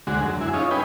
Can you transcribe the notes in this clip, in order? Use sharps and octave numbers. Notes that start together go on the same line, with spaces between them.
D2 G#3 F#4
F#2
E4 G#4
C#4 D#4 F4
D#4 G#4 B4 G5